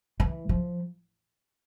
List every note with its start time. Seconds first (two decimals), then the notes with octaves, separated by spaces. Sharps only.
0.20 E3
0.49 F3